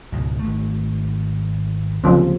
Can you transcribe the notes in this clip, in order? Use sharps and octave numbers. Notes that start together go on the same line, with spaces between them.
C#2 G#2 B2
G#1 A3
D1 C#3 F3 A#3 C4